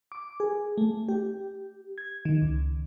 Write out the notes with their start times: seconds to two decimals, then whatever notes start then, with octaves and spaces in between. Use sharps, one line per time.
0.12 D6
0.40 G#4
0.78 A3
1.09 G4
1.98 G#6
2.25 D#3
2.41 C#2